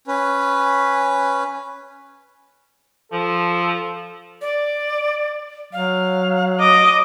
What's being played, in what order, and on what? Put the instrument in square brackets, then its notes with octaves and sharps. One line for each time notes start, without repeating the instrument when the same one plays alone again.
[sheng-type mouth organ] C#4 B4
[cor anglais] F3 [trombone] A4
[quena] D5
[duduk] F#3 [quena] F5
[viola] D#5 [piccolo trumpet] D6